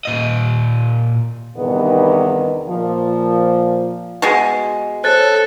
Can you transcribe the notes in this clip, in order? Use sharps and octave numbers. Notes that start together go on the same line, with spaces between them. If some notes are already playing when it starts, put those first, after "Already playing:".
A#2 D#5
E2 G2 C3 D#3 B3 D#4
A#2 F3
B2 G#3
A4 C5 C#5 F#6 A6